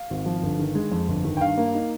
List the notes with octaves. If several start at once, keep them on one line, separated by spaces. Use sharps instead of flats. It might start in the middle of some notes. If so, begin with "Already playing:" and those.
Already playing: F5
G#1
F3
G1
D#3
G#3
F2
G1
D#3
G5
G2 F5
A#3
D#4